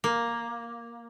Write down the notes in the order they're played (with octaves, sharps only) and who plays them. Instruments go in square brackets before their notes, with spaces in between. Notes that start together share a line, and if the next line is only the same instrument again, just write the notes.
[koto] A#3